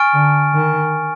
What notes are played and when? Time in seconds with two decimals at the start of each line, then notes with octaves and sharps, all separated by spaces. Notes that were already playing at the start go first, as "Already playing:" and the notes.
Already playing: G#5 C#6 F6 A6 D7
0.14 D3
0.54 D#3